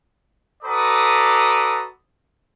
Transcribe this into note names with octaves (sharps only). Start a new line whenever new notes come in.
F#4 A4 B4 D5 A#5 D#6